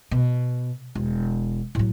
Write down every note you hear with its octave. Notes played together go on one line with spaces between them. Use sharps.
B2
E1
A2 F#3